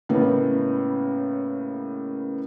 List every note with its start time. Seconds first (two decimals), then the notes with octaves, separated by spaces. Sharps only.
0.09 A2 C#3 G#3 A#3 B3